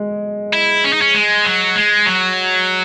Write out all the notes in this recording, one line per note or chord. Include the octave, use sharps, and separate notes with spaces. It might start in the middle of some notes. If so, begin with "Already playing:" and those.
Already playing: G#3
E4
C#4
D#4
C#4
G#3
F#3
G#3
F#3